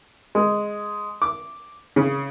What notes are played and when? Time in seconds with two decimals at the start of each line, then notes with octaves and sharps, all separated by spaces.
0.35 G#3
1.22 D6
1.96 C#3